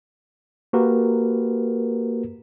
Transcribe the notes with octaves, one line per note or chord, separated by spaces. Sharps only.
A#3 F#4 G4 A#4 B4